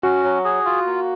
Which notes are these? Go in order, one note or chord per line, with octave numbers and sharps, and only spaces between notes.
C#4 F#4
F#3
G#4
F4
A#3